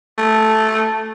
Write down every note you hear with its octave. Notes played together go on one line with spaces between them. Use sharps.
A3